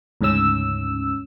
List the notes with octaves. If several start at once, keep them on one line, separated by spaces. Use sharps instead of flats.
D2 G#2 C#3 C#4 E6